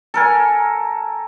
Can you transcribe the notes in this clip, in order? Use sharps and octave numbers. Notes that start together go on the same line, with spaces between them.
A4 A#4 G#5